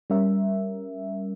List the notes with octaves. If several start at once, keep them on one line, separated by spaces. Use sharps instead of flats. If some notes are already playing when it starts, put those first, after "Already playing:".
G3 C#4 A#4 E5